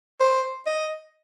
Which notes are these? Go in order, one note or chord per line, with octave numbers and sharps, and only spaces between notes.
C5
D#5